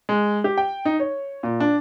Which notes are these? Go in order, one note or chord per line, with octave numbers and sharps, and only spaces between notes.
G#3
G4
G5
D#4
C#5
A#2
D4